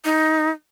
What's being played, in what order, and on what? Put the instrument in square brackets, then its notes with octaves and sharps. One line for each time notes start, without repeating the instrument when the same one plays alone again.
[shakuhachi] D#4